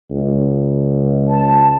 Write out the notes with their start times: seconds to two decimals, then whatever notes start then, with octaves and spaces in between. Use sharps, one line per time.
0.11 C#2
1.27 A5